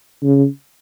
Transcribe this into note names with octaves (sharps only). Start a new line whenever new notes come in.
C#3